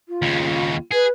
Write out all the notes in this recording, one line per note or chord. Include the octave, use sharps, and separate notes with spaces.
F4
D#2 C#3
G#4 B4